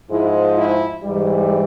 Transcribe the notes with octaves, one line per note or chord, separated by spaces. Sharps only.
G#2 F3 G#3 E4
E4
G#2 E3 G3